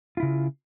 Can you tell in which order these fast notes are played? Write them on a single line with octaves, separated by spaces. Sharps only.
F4 E4 C#3